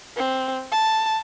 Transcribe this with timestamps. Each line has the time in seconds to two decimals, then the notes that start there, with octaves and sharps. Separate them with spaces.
0.16 C4
0.71 A5